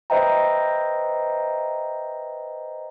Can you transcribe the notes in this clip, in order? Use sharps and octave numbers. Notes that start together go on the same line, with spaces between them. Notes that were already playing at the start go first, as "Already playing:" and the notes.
B4 C5 D#5 E5 G5 A#5